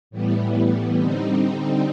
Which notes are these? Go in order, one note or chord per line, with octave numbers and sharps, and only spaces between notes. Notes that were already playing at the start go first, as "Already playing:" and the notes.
A2 E3 G3 B3
D3 G3 C4 D#4